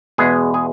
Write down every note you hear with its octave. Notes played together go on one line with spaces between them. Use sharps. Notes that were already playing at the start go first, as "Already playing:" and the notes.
E2 B2 G#3 B3 G#4
G#4